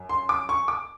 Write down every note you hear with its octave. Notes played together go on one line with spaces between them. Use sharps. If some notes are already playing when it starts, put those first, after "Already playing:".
Already playing: F#2
C6
D6
C#6
D6